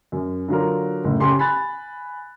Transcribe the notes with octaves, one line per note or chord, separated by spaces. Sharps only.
F#2
D3 F#3 F4 A#4
F#1 A2
C#3 G4 C6
G#5 B5 F#6 A6